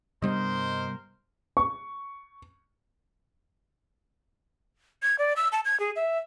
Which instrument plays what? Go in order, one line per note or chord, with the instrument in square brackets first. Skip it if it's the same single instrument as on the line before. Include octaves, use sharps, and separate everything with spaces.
[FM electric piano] G2 D#5 [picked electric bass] C3 G3 B3 [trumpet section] A#4 C5
[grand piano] C#6
[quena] G#6
D5
E6
A5
G#6
G#4
E5